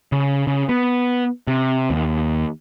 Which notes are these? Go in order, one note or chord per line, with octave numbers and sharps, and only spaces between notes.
C#3
C#3
B3
C3
D#2